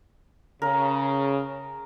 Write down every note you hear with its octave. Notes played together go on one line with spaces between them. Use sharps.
C#3 A#4